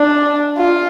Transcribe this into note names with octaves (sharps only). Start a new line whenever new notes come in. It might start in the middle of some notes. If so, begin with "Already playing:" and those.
Already playing: D4
F4